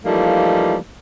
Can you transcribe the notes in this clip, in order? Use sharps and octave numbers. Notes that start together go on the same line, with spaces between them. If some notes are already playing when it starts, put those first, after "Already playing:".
E3 F3 G3 A3 A#3 D#4